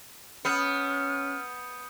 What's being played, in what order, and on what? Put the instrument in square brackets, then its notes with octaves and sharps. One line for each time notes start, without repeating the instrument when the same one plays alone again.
[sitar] B3 [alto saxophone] C#4 [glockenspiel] D#6 G6 C#7 [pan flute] F6